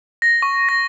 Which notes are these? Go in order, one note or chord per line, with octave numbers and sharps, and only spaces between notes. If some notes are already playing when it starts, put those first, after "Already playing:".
A#6
C#6
A#6